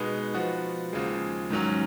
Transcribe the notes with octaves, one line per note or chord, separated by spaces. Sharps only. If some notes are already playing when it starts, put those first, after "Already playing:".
Already playing: B2 G#3 B3 D#4
F3 B3 F#4
D#2 C#3 F3 G#3
G#2 D#3 F#3 C#4